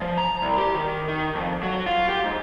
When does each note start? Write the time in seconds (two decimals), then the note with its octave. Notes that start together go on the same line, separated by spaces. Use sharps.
0.01 F3
0.18 A#5
0.42 C2
0.58 G4
0.75 D#3
1.08 D#3
1.35 F2
1.63 F#3
1.86 F4
2.09 G4
2.24 G#2